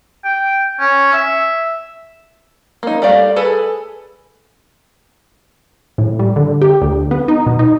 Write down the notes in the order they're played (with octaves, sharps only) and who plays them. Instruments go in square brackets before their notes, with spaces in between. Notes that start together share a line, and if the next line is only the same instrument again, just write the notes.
[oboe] G5
C#4
E5
[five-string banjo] A#3 D#4
G3 A3 D5 F5
G#4 A4 B4
[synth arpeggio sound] A2
G3
D3
G4
D2
B3
D#4
B2
D#4